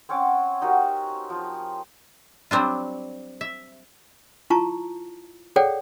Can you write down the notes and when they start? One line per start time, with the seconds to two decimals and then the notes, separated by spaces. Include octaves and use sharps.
0.09 C4 C#4 F#5 D6
0.62 D#4 F#4 G4 A#4
1.30 F3
2.51 F#3 G3 C4 D4 F4
3.41 E5
4.50 E4 F4 A5 A#5 C#6
5.56 G#4 A4 C#5 D5 F#5 G5